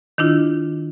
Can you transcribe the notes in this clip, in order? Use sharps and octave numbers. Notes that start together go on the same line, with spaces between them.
D#3 D4 E4 F4